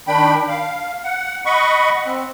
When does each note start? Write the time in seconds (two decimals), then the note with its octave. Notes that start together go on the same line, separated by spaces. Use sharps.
0.07 D#3 D4 G5 B5
0.48 F5
1.04 F#5
1.45 D#5 F#5 B5 C#6
2.05 C4